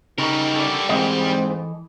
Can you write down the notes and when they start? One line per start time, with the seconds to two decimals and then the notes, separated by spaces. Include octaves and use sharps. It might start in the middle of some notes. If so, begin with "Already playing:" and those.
0.18 C#3 G3 D#4 A#4
0.56 A4 D5
0.89 G#2 E3 C4 A4 D#5